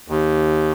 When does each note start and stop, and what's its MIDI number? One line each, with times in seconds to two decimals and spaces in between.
0.08 0.72 39